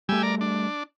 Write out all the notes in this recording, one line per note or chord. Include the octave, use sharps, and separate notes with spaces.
G3 A3 G4 G#5 E6
A#4 D5
D4